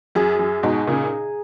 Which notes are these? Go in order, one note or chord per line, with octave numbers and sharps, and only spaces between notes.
F#2 G#4
F#2
G#2 B2 D#4
A#2 C#3